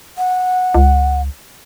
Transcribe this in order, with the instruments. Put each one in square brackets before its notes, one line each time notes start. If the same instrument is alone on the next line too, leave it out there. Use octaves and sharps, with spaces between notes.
[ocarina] F#5
[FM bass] C#2